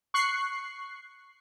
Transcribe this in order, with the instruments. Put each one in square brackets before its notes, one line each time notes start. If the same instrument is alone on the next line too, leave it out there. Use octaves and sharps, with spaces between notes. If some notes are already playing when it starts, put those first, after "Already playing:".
[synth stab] C#6 F#6 C7